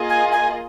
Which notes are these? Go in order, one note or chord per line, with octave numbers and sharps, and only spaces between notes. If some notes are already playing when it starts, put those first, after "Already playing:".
Already playing: A#3 F4 G#4 D#5
G#5
G#5